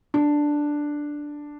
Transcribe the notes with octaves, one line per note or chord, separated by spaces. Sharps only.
D4